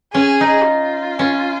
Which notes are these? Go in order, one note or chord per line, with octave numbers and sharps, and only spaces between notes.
C#4 G#4
D#4
F4
C#4